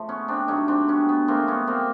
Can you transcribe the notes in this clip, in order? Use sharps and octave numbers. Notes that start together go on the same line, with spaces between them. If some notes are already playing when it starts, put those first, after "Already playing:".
Already playing: C#3 F3 A3
B3 C#4
C4 D4
G2 D3 F#3 A3 C#4 D#4
C4 D4
B3 C#4
B3
C#3 F#3 A3 A#3 C4
B3 C#4
A#3 C4